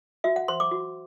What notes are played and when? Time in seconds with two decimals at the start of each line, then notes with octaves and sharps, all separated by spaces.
0.24 F#4 E5
0.36 F#5
0.48 C5 C6
0.60 D6
0.71 F#4